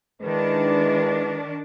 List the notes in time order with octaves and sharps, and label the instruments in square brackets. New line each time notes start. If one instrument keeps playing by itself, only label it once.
[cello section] D#3 D4 [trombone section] G#3 E4 B4